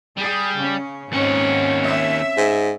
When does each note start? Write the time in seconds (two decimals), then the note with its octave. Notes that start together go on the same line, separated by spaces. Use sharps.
0.18 G3 G#4
0.56 C#3 C#4
1.12 D#2 G#2 C4 C#4 F#5
1.85 E5
2.37 G#2